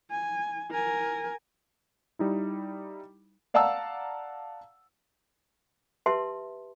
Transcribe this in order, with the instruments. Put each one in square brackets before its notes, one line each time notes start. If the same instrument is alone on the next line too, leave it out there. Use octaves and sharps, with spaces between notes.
[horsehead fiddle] G#5
A#4 G#5
[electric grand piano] G3 D#4 E4
[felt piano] D5 F5 F#5 A5 A#5 E6
[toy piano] G4 B4 E5 A5 C6